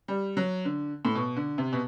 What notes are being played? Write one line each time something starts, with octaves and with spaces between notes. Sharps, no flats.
G3
F#3
D3
A2
B2
D3
C3
B2